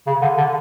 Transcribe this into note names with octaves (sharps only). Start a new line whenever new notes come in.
C#3
D3
D3